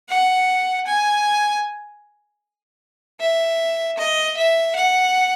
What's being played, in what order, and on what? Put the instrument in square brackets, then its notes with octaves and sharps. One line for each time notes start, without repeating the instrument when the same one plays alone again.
[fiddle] F#5
G#5
E5
D#5
E5
F#5